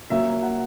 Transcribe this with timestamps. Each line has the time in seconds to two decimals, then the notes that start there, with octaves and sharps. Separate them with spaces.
0.10 A#2 F#3 A#3 E5
0.43 F#5